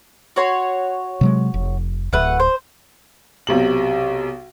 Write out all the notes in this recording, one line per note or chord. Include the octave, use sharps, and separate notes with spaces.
F#4 C#5 C6
C3 F#3 G#3
F1
D1 A3 B4 F#5
C5
B1 C3 F#7